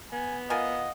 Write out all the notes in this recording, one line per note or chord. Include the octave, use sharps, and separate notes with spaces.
B3 G#5
F4 A#4 D#5 F5 F#5 G#5